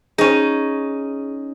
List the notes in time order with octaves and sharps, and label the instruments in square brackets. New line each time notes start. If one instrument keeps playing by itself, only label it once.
[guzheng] C#4 D#4 [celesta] G#4 D#7